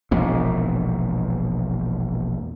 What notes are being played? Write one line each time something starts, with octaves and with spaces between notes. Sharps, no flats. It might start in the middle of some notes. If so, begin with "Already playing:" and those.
E1 A#1 G#2